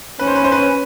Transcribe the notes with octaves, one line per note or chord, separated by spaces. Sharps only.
C#4 B4
C5
B4
C5
B4